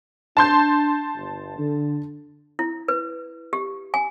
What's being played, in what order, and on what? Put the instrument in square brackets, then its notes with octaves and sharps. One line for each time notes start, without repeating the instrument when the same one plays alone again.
[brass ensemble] D4 [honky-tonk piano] A5 C6 G6
[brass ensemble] G1
D3
[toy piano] E4
B4
G4
G#5